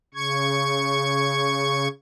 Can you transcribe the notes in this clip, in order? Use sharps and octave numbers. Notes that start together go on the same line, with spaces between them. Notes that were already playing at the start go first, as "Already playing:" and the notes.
C#3 C#6 G#6